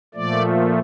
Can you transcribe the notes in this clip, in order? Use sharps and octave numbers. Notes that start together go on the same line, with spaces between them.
A#2 F3 A3 D5